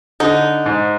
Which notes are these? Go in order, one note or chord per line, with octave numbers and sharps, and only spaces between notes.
D3 D#4
G#2